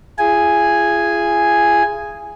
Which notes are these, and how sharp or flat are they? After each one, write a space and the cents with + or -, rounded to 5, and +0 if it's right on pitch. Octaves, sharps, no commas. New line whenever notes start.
F4 -45 G#4 +0 G#5 -5